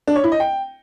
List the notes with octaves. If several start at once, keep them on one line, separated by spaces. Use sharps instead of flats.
D4
C#5
E4
D#5
G5